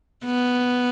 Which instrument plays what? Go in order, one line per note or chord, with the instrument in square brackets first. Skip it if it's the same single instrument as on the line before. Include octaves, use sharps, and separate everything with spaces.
[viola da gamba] B3